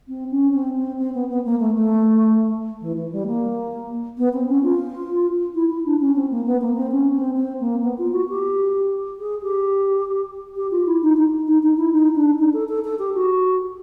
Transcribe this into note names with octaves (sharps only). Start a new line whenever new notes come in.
C4
C#4
C4
C4
C4
B3
B3
A#3
A3
A3
E3
E3
G3
A#3
B3
C4
C#4
F4
E4
E4
D4
C#4
C4
A#3
B3
A#3
C4
C#4
C4
C4
A#3
B3
F4
F#4
G4
G#4
G4
G4
F4
E4
D#4
D#4
D#4
D#4
E4
D#4
D4
D#4
A4
A4
A4
G4
F#4